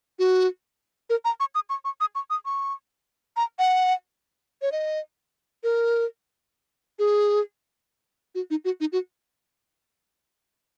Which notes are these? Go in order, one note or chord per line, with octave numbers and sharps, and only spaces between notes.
F#4
A#4
A#5
C#6
D#6
C#6
C#6
D#6
C#6
D#6
C#6
A#5
F#5
C#5
D#5
A#4
G#4
F#4
D#4
F#4
D#4
F#4